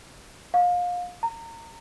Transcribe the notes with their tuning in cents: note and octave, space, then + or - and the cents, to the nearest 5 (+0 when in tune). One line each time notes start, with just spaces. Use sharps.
F5 +30
A#5 -25